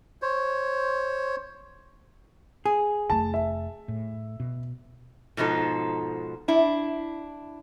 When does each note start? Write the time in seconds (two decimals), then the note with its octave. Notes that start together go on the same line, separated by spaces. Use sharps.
0.22 C5 C#5
2.66 G#4
3.10 F1 A3 A5
3.34 E5
3.88 A2
4.40 B2
5.37 G#2 B2 F3 D#4 A4
6.48 D4 E4